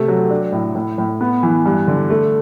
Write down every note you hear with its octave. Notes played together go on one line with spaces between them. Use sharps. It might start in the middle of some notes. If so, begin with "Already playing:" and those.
Already playing: C3 A3
F#3
D4
A2
A2
A2
B3
E3
G2
D3
A3